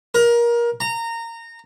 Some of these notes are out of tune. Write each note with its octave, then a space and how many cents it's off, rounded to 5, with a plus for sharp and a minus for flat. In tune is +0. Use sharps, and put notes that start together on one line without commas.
A#4 +25
A#5 -20